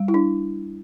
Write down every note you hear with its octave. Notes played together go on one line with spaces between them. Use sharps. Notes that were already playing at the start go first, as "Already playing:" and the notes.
Already playing: G3
E4
D4